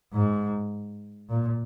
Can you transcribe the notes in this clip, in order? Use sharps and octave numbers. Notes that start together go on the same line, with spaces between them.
G#2
A#2